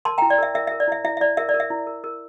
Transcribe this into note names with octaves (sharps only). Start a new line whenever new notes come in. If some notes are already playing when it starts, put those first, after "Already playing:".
A#4 A5 C6
E4 G5 A#5
D5
A#4 E5
A#4 E5
A#4 E5
D5
E4 E5
E4 E5
E5
E4 D5
A#4 E5
D5
A#4
E5
E4
A#4
A#4